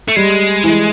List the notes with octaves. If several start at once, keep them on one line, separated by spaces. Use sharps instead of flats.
A3
G3 G#3
E3